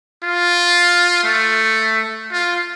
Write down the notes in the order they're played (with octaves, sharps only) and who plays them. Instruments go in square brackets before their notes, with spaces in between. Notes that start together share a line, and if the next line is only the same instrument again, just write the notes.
[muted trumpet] F4
A3
F4